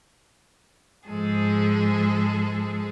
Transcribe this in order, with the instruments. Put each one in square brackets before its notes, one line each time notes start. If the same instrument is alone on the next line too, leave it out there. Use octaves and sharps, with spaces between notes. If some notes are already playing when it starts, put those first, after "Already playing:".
[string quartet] G#2 F3 G#3 G#4 A4